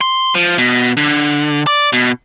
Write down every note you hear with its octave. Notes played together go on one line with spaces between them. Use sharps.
C6
F3
B2
D3
D5
B2